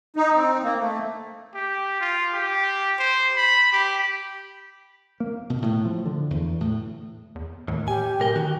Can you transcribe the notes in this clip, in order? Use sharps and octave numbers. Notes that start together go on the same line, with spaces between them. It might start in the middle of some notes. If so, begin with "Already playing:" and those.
D#4
C4
A#3
A3
G4
F4
G4
C5
B5
G4
A#3
B2
A2
F3
D3
E2
A2
E2
D#2 A2
G4 G#5
B1 A#2 A#4 G5
D#3 F#4